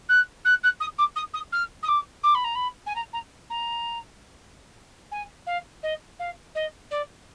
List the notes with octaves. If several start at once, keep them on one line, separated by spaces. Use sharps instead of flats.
F#6
F#6
F#6
D#6
D6
D#6
D#6
F6
D#6
D6
D6
B5
A#5
B5
G#5
A#5
A#5
A#5
G#5
F5
D#5
F5
D#5
D5